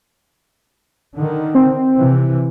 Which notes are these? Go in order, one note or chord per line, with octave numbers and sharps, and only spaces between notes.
D3 D#3
C4
C3 E3